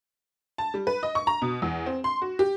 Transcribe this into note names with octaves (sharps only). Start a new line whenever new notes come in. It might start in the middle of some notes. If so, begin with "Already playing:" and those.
A5
G3
B4
D#5
C#6
A#5
B2
E2
C4
C6
F#4
G4